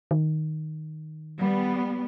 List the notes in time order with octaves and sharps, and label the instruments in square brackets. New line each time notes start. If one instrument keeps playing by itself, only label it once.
[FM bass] D#3
[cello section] G3 B3